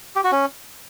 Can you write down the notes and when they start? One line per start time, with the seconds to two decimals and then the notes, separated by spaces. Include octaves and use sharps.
0.16 G4
0.24 F#4
0.32 C#4